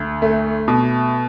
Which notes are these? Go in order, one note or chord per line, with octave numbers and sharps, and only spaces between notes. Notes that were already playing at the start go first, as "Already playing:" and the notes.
Already playing: D2
A3
B2